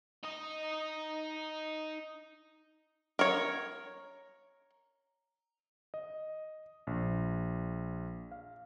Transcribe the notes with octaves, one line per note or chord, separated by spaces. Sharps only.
D#4 D#5
A#4 C#5
D#5
A#1
F5